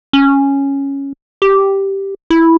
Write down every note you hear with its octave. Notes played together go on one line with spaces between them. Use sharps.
C#4
G4
E4